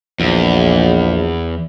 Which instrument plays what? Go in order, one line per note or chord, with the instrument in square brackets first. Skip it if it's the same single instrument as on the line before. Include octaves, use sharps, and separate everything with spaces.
[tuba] A#1 [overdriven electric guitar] E2